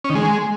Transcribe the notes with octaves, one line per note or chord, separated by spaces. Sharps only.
C#4
D#3
G#3